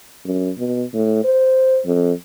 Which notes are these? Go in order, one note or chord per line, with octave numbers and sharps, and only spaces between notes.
F#2
B2
A2
C5
F2